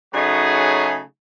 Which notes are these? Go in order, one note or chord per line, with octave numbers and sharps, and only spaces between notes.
C#3 F#3 A3 D#4 F#4 G#4